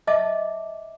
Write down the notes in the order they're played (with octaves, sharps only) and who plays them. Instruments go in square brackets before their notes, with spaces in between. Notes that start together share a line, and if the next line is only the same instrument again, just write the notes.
[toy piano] D#5 E5 A5 D6